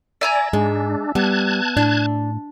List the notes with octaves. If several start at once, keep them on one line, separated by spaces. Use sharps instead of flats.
D5 E5 G#5 A#5
G#2 G#3 D4
G3 B3 A5 F#6 G#6
A2 D4